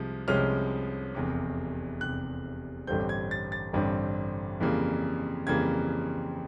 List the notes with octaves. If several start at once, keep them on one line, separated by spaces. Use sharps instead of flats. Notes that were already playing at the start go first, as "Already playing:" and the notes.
Already playing: C2 C3 F3 G#3
C2 C3 F3 G#3 C#4 F6
F1 E2 C3
F1 E2 C3 F#6
A1 G2 D3 G3 C4 G6
G#6
A6
A6
A1 G2 D3 G3 C4
F2 C#3 E3 G3 A#3
F2 C#3 E3 G3 A#3 G#6